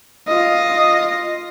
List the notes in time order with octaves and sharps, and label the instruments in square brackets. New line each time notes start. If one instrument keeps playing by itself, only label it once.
[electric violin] F4 D#5